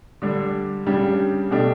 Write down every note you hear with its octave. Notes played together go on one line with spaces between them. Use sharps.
D3 G3 D4
C#3 G3 D4 G4
B2 A3 D4 G4